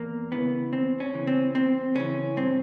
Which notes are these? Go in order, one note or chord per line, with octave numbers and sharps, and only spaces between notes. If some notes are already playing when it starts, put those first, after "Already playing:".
Already playing: E2 A#3
C#3 E3 B3
E2 C4
C#4
C#3 E3
C4
E2 C4
C#3 E3 C#4
G2 C4